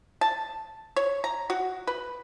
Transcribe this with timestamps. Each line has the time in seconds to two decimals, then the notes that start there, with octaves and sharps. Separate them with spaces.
0.21 A5
0.96 C#5
1.24 A#5
1.50 F#4
1.87 B4